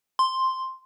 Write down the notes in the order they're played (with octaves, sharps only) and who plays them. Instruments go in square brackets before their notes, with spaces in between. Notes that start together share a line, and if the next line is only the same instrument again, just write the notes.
[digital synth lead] C6